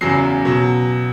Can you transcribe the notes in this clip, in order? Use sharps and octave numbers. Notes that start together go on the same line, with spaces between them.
E2 C#3 F#3 C7
B2 F#3